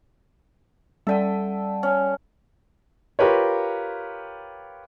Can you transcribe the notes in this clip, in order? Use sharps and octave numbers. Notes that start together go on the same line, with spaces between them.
G3 A4 D5 F#5 G5
C#4
F4 G4 A#4 B4 C#5